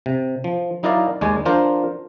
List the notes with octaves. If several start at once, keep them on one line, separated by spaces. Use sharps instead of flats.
C3
F3
F#3 D#4 E4 A#4 D5 F5
D#2 G#3 D5 G#5
F3 D4 F4 A#4 C5